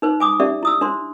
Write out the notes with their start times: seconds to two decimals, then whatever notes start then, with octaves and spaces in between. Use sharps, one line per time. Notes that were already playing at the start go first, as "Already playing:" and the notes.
0.02 D#4 B4 C5
0.20 G#5 D6 D#6
0.40 C#4 G4 D5 E5
0.63 E4 D#6 E6
0.81 D4 C5 C6